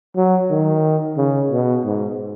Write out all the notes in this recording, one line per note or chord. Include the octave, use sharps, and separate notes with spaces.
F#3
D#3
C#3
B2
G#2